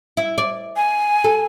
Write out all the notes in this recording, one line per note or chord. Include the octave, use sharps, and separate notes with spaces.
E4
D5
G#5
A4